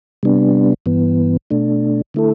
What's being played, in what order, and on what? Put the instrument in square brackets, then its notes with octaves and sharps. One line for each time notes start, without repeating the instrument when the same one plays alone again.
[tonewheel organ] C3 G3 B3 D4
G2 E3 B3
B2 A3 D4
D3 A3 E4 A4